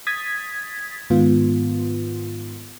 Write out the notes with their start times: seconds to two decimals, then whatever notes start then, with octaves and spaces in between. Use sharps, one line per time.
0.07 D#6 G#6 A6 B6
1.10 G#2 D#3 B3 F4